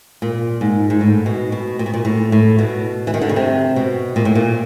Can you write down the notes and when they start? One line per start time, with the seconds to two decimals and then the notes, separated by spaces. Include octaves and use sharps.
0.22 A#2
0.61 G#2
0.90 G#2
1.01 A2
1.26 B2
1.52 B2
1.79 A#2
1.86 B2
1.94 A#2
2.05 A2
2.32 A2
2.59 B2
3.07 E3
3.14 D#3
3.21 D3
3.29 C#3
3.36 C3
3.76 B2
4.16 A#2
4.25 A2
4.35 A#2